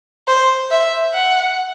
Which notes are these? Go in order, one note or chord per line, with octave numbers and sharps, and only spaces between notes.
C5
E5
F#5